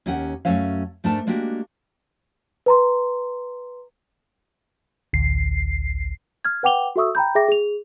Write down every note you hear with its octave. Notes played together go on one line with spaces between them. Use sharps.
D#2 C#4 G4 A#4 F#5
F#2 F#3 A3 C#4 F5
G#2 A3 D4 A#4 A5
G#3 A#3 D4 F#4 G4
B4 A#5 C6
A1 D2 C7
F6 G#6
B4 F#5 G5 D6 F7 G7
F#4 A4 E5 C#6 D#6 E6
G5 A#5 B5 G6
G#4 E5 G5 D6 A#6
G#4 F7